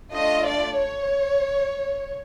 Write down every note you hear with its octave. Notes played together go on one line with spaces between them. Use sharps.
A3 D4 F4 D#5
D5
C#5